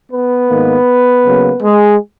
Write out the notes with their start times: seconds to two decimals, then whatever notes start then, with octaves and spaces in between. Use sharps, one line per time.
0.11 B3 B4
0.48 G#2 D#3 A#3
1.25 C#3 F#3 A#3
1.62 G#3 G#4